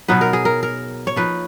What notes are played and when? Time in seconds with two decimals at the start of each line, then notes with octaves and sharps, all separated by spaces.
0.08 B2 F#3 B3 D#4 B4
0.21 A#4
0.33 G#4
0.45 A#4
0.63 A#4
1.07 C#5
1.16 F3 A#3 D#4 B4